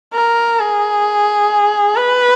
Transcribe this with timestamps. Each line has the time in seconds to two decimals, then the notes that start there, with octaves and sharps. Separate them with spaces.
0.13 A#4
0.60 G#4
1.97 B4